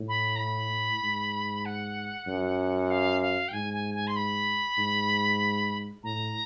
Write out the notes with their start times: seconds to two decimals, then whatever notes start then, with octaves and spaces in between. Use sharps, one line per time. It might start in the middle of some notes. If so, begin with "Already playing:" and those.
Already playing: A2
0.08 B5
0.36 A#5
0.39 B5
1.03 G#2
1.65 F#5
2.27 F#2
2.90 F5
3.22 F5
3.48 G5
3.53 G#2 G#5
3.74 G#5
3.94 G#5
4.07 C6
4.16 B5
4.78 G#2
6.04 A2 A#5